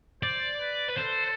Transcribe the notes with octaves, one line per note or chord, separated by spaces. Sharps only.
C5 D5
B4
B4
A4 C5